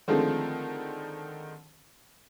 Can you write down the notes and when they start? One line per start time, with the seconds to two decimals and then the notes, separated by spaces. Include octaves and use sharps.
0.08 D3 D#3 F3 G#3 A3 C4